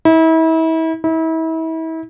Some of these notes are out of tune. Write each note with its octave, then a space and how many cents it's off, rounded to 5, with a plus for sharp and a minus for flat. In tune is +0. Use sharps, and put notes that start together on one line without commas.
E4 -35
E4 -35